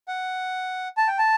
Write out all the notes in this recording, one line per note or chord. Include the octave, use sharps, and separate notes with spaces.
F#5
A5
G5
A5